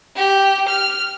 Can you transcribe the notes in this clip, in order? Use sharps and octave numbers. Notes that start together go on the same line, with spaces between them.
G4
F6